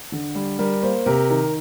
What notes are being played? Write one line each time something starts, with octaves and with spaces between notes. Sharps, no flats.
D3
G3
G3 A#4
A#3 C5
C3 A#4
D#3 A#4